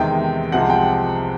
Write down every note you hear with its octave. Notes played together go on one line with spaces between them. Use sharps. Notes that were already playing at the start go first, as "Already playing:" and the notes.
Already playing: E2 C3 D#3 G#3 G5
C2 C3 F3 G#3 F#5
G5